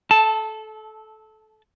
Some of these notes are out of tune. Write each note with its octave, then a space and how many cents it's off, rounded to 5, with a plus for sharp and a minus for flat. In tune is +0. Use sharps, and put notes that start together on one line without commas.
A4 -20 A5 +0